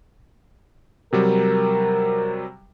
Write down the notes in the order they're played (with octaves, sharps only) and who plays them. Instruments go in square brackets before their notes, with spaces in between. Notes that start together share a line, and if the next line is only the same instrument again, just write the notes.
[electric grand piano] C3 F#3 G3 [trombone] A#4